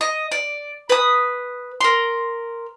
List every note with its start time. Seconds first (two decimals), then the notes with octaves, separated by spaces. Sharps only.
0.01 D#5
0.31 D5
0.90 B4 D#6
1.81 A#4 C6